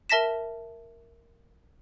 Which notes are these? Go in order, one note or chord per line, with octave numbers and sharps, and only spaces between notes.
A#4 E5 A5 A#6 B6 E7